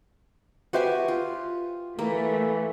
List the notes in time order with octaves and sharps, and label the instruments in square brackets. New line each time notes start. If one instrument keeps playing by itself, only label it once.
[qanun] F#4 G4 G#5 [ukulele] B4 C5 E5
[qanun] F4
[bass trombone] E3 [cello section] A3 [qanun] A#3 [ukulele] A#4